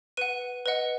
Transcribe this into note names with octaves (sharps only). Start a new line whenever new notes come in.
B4 F#5 D#7
B4 D#5 F#5